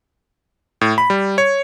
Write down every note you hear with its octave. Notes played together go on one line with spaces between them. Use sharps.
A2
B5
G3
C#5